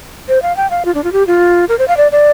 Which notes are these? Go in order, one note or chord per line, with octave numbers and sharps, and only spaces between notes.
C5
F5
G5
F5
F4
D4
F4
G4
F4
A#4
C5
F5
D5
D5